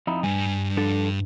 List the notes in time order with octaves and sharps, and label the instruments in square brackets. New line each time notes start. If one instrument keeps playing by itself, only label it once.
[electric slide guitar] F2 D#4 E4
[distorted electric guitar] G2 [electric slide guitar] G#5
[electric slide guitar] F3 D4 A4